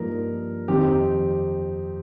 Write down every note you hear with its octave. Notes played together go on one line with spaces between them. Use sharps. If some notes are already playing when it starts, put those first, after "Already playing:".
Already playing: G2 F3 A#3 D#4 A#4
F2 D#3 C4 D#4 G4